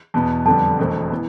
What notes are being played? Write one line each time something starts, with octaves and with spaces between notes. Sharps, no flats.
E2 B2 B3 A5
F2 D3 G3 B3 A5
E1 E2 B2 A3 C4
E3 B3